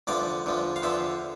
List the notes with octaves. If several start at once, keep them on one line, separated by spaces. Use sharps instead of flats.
E2 D3 F3 D5
E2 D3 F3
F5
E2 D3 F3 E5